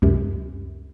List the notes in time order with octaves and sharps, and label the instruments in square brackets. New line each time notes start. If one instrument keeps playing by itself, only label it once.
[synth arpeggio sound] C#2 F#2 C3